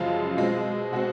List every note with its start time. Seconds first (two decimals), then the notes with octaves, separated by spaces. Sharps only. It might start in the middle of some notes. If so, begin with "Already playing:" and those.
Already playing: F#2 C#3 F3 G#3 F4
0.37 B2 G#3 C4
0.92 B2 G#3 C4 F#4